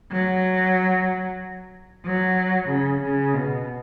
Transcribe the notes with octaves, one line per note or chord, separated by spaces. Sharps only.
F#3
F#3
C#3
C#3
B2